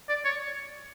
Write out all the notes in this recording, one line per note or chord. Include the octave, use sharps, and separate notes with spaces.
D5
C#5